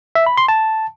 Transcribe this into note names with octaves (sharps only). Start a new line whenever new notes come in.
E5
B5
C6
A5